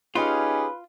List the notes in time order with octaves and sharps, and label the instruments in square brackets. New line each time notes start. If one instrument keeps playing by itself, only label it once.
[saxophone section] C#4 D#4 [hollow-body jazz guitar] F4 [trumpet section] G4 G#4 [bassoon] B4